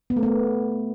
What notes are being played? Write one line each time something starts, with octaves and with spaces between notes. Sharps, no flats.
B3
A3
B3